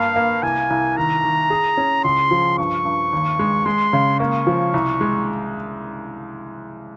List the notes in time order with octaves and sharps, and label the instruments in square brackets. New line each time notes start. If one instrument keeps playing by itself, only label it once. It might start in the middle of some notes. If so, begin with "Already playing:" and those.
Already playing: [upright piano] G2 A#3 [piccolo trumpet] F5
[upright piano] A#3
[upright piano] C2 [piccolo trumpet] G#5
[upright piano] C2
[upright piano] D#3 [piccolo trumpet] A#5
[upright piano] D#3
G#4
C#4
[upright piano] C#2 [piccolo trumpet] C6
[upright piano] F3
[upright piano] G2 [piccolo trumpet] C#6
[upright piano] G2
D#2
G#3
[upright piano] G#3 [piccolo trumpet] C6
[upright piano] C#3
[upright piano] A#3 [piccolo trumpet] C#6
[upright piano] F3
C2
G#3